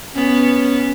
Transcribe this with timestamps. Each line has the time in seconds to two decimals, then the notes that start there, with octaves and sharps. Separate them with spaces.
0.16 B3 C#4